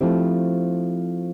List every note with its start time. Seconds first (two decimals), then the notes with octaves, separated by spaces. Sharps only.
0.01 F3 A3 C4 E4 G4